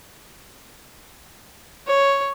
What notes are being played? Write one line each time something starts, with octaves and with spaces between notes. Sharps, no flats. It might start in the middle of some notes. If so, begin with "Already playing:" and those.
C#5